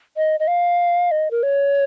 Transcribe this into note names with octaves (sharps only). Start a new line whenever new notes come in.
D#5
D#5
F5
D#5
A#4
C#5